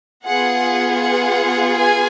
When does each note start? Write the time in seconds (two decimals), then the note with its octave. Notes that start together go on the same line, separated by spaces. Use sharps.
0.25 B3 F4 G#4 F#5
1.01 F#5
1.77 G#5